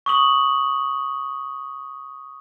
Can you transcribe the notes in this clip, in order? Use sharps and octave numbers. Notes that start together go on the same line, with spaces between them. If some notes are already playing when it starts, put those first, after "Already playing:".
C#6 D#6 F#7